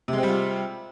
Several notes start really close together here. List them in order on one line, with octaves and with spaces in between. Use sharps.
C3 G#3 C4 G3 F4